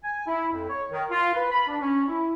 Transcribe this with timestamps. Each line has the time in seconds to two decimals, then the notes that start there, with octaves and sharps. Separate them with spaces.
0.03 G#5
0.27 E4
0.52 F2
0.69 C#5
0.92 D#3
1.11 F4
1.35 B4
1.52 B5
1.68 D4
1.81 C#4
2.08 E4